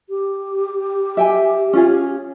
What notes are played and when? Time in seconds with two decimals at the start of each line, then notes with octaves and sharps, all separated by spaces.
0.09 G4
1.17 E5 G5 G#5
1.73 C#4 F4 G#4